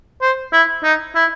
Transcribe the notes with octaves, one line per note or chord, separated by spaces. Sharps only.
C5
E4
D#4
E4